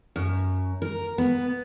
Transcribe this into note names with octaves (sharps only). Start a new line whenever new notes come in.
F#2
A#4
B3